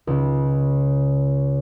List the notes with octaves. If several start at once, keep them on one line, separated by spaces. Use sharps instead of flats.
C#2 C#3